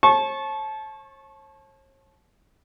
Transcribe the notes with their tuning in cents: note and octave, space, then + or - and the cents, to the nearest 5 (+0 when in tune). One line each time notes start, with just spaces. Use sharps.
C#5 -45 A5 -25 C#6 -20